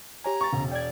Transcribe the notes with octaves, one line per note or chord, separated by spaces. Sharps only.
G4 C#5 G#5 A#5
C#6 A6
E1 C#3
D5 G5 G#6